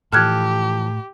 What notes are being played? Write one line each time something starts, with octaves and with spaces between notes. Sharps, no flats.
A2 E3 F3 G4 A4 F6 F#6 G#6